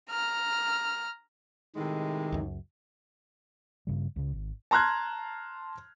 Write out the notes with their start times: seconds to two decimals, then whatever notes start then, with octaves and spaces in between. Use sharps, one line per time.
0.10 A#5 F6
1.76 A2 C3 D#3 G#3
2.32 C#2 F#2
3.87 G2 C#3 G3
4.16 C#2 C#3
4.33 G#1
4.71 A5 A#5 C6 F6 F#6 G#6